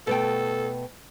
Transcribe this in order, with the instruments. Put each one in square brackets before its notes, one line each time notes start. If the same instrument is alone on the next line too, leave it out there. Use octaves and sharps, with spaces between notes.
[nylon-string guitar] B2 A3 G5 [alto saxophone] A4